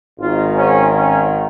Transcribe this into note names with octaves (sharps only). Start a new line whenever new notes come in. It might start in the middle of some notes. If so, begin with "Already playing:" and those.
G#1 G#2 D#3 F4
C#4
C#4